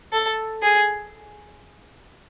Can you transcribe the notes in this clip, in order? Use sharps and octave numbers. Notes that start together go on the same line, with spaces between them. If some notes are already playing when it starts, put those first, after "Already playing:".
A4
G#4